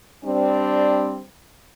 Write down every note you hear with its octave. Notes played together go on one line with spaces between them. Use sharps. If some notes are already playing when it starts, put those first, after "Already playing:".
G3 C4 D4